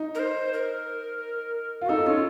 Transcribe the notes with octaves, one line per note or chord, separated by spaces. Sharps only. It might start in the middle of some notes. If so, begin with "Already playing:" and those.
Already playing: D#4
A#4
C5
A#4
F4
F#4
D#4 A4
C#4 F4